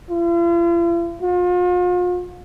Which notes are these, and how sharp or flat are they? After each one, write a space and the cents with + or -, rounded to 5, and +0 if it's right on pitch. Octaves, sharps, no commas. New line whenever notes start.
F4 -45
F4 +40